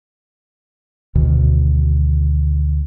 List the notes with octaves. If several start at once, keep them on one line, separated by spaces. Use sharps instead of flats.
D2 B2 D#3